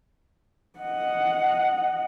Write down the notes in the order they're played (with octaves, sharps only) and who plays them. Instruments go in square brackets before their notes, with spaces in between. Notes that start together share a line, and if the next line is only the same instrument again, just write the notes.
[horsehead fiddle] D#5 F#5